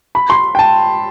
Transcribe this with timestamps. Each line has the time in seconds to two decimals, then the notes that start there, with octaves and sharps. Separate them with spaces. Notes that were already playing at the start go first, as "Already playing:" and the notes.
0.15 B5
0.30 C6
0.55 G5
0.59 A5